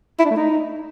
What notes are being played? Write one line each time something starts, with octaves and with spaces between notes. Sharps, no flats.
E4
D4
A3
D#4